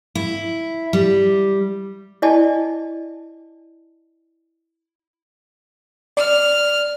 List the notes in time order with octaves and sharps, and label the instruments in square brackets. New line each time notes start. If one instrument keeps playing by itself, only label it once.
[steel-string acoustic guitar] E4
G3
[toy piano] E4 D5 D#5 G#5 A5
[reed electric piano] D5 [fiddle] F6